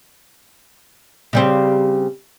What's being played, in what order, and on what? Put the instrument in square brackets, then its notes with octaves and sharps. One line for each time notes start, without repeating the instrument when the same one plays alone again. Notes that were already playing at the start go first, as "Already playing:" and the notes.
[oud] C#3 G3 C4